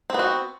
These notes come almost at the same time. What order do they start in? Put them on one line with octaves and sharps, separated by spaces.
C4 B3 F#4